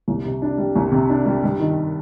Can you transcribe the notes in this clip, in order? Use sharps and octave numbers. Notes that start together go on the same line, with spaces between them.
C2
C3
D4
G3
C2
C3
D4
G3
G2
D#3